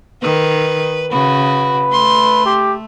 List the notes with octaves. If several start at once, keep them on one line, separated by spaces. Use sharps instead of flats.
D#3 B4
C#3 F#4 B4
A3 C6
G4